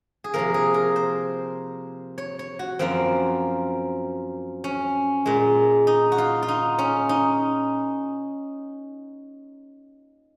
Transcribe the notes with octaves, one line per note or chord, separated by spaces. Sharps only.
G#4
C3 F3 A#3 A#4
G#4
A#4
C5
C#5
C#5
F#4
F#2 F3 A#3 C4
C#4
A#2 G#3
D#4
F#4
F4
F4
D#4
C#4
D#4